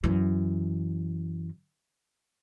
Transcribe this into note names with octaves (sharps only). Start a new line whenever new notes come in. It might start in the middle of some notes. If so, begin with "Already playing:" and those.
F#2 E3